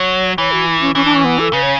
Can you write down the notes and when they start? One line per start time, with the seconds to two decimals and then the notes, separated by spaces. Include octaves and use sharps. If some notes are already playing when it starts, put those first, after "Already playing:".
Already playing: F#3 C#5
0.38 E3 C#5
0.52 F#4
0.66 E4
0.81 C#4
0.95 E3 C#4
1.05 D4
1.15 C#4
1.25 B3
1.39 A4
1.53 C#3 B4
1.63 C#5